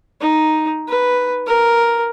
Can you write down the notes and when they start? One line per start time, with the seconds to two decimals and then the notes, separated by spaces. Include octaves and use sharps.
0.21 D#4
0.88 B4
1.47 A#4